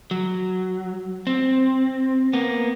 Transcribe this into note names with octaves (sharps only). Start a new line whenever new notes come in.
F#3
C4
A#3 B3